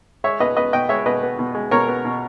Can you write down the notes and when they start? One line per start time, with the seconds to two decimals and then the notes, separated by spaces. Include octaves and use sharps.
0.24 G#3 C#5 E5
0.40 B2 B4 D#5
0.57 B3 B4 D#5
0.73 B2 D#5 G5
0.89 G#3 C#5 E5
1.06 B2 B4 D#5
1.23 B3
1.39 B2
1.55 G#3
1.71 B2 A#4 C#5
1.88 B3
2.05 B2